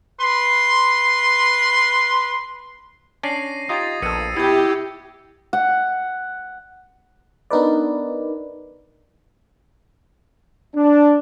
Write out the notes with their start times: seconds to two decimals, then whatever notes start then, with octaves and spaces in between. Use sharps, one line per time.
0.18 B4 C6
3.23 C#4 D4 D5 A#6 C7 D#7
3.69 D#4 F4 G4 D#6 G#6 A6
4.02 A#1 B3 A4 E6 C#7 D#7
4.37 B2 B3 E4 G4 E6 G#6
5.53 F#5
7.50 B3 D4 D#4 A#4 B4 D5
10.75 D4